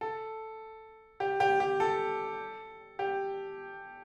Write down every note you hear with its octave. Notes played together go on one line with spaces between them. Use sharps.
A4
G4
G4
G4
A4
G4